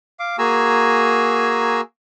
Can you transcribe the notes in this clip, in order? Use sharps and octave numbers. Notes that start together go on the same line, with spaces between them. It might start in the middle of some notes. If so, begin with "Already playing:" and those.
F5 D6
A#3 F#4 G#4 G#5 A#5 E6